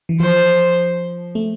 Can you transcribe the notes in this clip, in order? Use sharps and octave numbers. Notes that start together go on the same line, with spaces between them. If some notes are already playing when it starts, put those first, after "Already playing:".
E3
F3 C5
A3